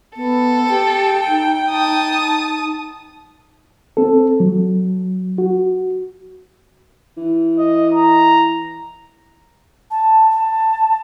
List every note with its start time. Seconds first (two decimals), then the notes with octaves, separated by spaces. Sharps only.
0.17 B3 A4
0.69 G4 G5
1.28 D#4
1.71 A5 D#6
3.97 C4 A4
4.40 F#3
5.38 F#4
7.17 E3
7.58 D#5
7.94 A#5
9.91 A5
10.31 A5